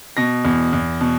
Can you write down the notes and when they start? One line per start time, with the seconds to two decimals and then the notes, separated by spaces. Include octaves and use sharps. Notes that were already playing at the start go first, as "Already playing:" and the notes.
0.17 B2 A#6
0.45 E2
0.73 E2
1.01 B2